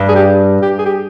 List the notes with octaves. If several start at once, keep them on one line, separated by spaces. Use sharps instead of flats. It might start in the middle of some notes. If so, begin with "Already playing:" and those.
Already playing: G2
G#4
G4
G4
G#4
G4